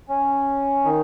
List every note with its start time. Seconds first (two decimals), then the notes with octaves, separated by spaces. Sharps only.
0.09 C#4
0.85 D#3 D#4